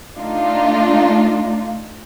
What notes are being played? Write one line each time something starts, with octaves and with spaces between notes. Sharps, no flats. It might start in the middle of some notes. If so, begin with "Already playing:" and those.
A3 D4 D#4 F4